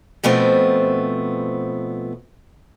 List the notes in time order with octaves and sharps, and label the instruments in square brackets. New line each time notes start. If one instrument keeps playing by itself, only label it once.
[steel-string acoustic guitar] B2 F3 A3 B3 C4